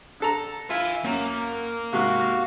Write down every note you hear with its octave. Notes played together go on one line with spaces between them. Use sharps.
D3 A4 A#5
F4 E5 G#5
F#2 A#3
G#2 C3 F#4 F5